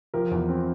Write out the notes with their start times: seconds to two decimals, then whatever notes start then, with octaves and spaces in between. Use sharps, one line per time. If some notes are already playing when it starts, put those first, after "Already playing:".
0.14 F3 G4 A#4
0.31 E2
0.49 C4